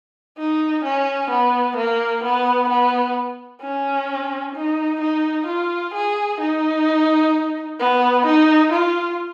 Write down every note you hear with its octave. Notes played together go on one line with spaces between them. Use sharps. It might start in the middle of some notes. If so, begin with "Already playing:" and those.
D#4
C#4
B3
A#3
B3
B3
C#4
D#4
D#4
F4
G#4
D#4
B3
D#4
F4